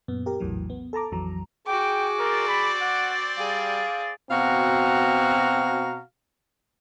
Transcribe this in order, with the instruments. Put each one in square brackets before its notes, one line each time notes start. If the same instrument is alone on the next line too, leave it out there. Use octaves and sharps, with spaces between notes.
[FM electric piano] F#2 A#2 B3
G4 A#4
A#1 E2 A2 E3 F#3
B3
A4 A5 A#5 D6
A#1 F2 E3 F#3 A#5
[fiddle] F#4 D6 [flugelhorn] G#4 [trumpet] G5
[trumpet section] C4 D5 [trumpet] A#4
[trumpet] B5
F#5
[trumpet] G3 [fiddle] G#4 [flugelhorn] F5
[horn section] B2 C4 F#4 F5 A#5